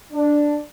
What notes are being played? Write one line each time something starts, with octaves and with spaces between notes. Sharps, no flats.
D4